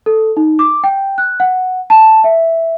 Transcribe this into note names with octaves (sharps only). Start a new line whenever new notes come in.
A4
D#4
D6
G5
F#6
F#5
A5
E5